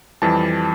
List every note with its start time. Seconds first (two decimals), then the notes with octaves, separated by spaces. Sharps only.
0.22 F2 E3 G3 A5